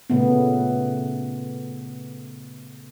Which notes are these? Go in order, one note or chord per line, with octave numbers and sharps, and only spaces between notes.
A#2 C#3 A3 B3